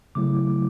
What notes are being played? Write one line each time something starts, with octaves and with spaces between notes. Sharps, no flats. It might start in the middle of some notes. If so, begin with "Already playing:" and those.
C#3 F#3 A3 E4 D6